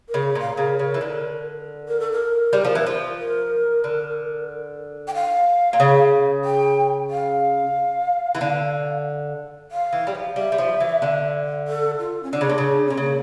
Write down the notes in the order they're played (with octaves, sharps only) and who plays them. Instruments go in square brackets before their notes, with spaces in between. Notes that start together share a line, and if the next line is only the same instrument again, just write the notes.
[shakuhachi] A#4
[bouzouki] C#3
A#2
[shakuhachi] F5
[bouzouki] C#3 [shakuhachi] A#4
[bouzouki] C#3
E3
D3
[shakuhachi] A#4
A4
A#4
[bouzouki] G3
F3
E3
F3
[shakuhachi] A#4
[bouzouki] D3
[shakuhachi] G5
F5
[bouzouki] A#2
C#3
[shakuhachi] G5
F5
[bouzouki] E3
D3
[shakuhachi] F5
[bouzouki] E3
G3
F3
[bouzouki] G3 [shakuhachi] E5
[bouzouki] G3
F3
E3
D3
[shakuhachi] A4
F4
C#4
[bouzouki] D3 [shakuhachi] D4
[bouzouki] C#3
A#2
C#3
[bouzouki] A#2 [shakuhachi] C#4
[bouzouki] C#3 [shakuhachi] A#3